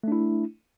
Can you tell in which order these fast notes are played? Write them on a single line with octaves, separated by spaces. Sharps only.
A3 D4 E4